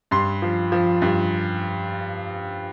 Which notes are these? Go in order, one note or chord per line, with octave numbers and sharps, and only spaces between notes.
G2 C6
F3
F3
G2